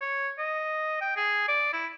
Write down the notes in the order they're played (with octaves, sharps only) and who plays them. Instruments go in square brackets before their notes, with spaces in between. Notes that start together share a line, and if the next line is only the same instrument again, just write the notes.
[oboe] C#5
D#5
G5
G#4
D5
E4